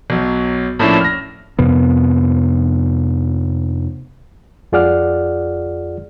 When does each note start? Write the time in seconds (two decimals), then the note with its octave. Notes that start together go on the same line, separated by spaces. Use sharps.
0.10 B1 F#3
0.79 A2 F3 A#3 C#4 D4 E4
1.01 F6 A#6
1.59 F2 C3 B3
4.72 F2 F4 G#4 D5 F#5 F6